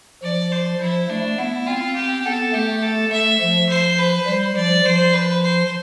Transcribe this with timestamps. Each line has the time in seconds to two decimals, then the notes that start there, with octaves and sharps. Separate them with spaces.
0.22 F3 D5
0.52 C5
0.81 F3 E4
1.09 A3 D4
1.38 B3 E4
1.67 C4 F4
1.96 G4
2.25 B3 A4
2.53 A3 G4
2.82 A4
3.12 A3 E5
3.40 F3
3.69 C5
3.98 B4
4.27 G3 C5
4.56 F3 D5
4.85 F3 C5
5.13 B4
5.42 C5